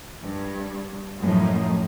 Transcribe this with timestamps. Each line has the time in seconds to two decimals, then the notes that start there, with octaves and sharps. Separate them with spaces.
0.22 G2
1.19 F#2 A2 F3 D#4